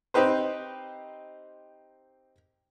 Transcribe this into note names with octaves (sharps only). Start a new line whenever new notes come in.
C4 D#4 G4 B4 C5